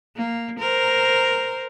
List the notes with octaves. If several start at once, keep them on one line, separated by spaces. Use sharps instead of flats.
A#3
A#4 C5